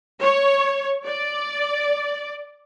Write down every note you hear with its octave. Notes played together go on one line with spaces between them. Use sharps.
C#5
D5